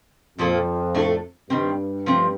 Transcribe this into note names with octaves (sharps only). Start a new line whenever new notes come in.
F2 A#2 F3 A#3 F4 A4
A2 A3 D4 F4 A4
G2 D#3 G3 C4
F3 A3 C4